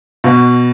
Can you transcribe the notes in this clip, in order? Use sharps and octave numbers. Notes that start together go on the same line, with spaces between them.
B2